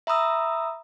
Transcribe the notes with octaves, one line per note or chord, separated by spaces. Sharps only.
E5 A#5 B5 D#6 E6